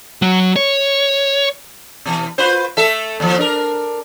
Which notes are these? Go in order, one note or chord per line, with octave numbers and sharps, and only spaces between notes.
F#3
C#5
B2 E3
F4 B4 C5
A3 A4 E5
D#2 F3
D4 A#4